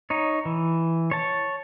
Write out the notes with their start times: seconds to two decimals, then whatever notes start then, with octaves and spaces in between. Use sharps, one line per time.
0.10 D#4 C#5
0.45 E3
1.11 C#5 A5